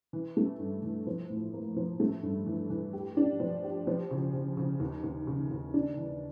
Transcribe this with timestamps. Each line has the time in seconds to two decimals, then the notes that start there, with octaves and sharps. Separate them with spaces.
0.13 E3
0.37 A3
0.59 G2
0.83 E3
1.07 F3
1.30 A2
1.53 A#3
1.77 F3
2.00 A3
2.23 G2
2.46 E3
2.70 E3
2.93 G4
3.17 D4
3.40 F3
3.64 G4
3.87 F3
4.11 C#3
4.33 C#3
4.57 C#3
4.80 D#2
5.04 D#2
5.27 C#3
5.51 D#2
5.74 D4
5.97 E3